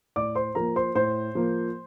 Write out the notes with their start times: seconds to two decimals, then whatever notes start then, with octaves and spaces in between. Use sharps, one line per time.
0.16 A2 D5 D6
0.35 C5 C6
0.55 F3 A#3 A#4 A#5
0.76 C5 C6
0.95 A2 C5 C6
1.35 F3 A#3